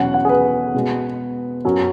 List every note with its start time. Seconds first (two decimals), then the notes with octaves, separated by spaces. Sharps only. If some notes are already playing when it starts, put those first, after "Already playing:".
Already playing: E2 B2 F#3 C#4 F#5
0.14 F#5
0.25 G#4
0.29 B4
0.74 B2 G#3 B3
1.65 F#2 F#3 C#4